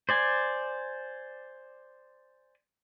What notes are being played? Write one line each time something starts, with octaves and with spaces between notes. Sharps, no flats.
C5 D5 G#5